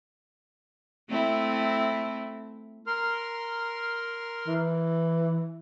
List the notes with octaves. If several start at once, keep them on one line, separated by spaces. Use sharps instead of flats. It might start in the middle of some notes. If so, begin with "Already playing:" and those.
A3 C4 E4
A#4 C6 F6
E3